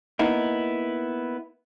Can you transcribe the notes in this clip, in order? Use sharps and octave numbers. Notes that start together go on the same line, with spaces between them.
A#3 B3 D#4 E4